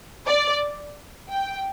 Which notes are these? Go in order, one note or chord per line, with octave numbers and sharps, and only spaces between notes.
D5
G5